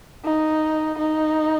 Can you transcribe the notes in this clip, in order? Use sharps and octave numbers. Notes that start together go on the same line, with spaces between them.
D#4
D#4